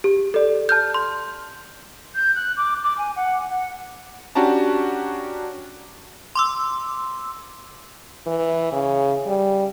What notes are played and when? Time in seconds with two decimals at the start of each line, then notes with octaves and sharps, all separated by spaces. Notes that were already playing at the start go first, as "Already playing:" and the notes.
0.04 G4
0.34 A4 D5
0.69 A5 F6 G6
0.94 C6
2.15 G6
2.36 F#6
2.57 D6
2.83 D6
2.98 G#5
3.16 F#5
3.50 F#5
4.35 C#4 D4 F#4 G4 A5 A#5
6.35 C6 D6 E6
8.26 E3
8.72 C#3
9.26 G3